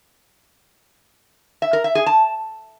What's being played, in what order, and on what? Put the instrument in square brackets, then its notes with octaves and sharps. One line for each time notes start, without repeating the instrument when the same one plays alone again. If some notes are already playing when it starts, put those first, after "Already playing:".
[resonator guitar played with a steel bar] E5
A#4
E5
G#4
A5